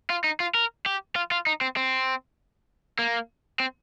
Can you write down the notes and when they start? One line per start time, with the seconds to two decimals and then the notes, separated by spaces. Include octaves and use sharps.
0.10 F4
0.24 D#4
0.40 F4
0.55 A#4
0.86 G4
1.16 F4
1.32 F4
1.47 D#4
1.61 C4
1.77 C4
2.99 A#3
3.60 C4